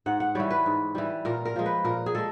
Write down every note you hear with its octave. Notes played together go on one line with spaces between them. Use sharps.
G#2 F#5
F#5
E3 G3 C#5
B4
G#2
E3 G3
A#2 A#4
A#4
F3 G#3
B4
A#2 A#4
G#4
G#3 A4